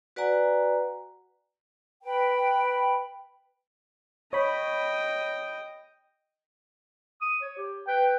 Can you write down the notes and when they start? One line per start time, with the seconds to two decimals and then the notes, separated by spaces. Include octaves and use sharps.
0.16 F#4 B4 D5 F#5 G#5 A#5
2.04 B4 G5 B5
4.33 C#5 D#5 G5 B5
7.22 D#6
7.42 C#5
7.57 G4
7.87 B4 G5